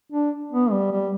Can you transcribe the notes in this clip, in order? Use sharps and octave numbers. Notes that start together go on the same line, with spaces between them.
D4
B3
G3
G3